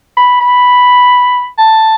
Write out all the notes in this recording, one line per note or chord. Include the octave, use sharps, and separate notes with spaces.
B5
B5
A5